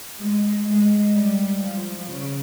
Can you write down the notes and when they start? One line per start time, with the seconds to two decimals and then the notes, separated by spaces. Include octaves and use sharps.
0.20 G#3
0.67 G#3
1.14 G3
1.61 F3
2.09 C#3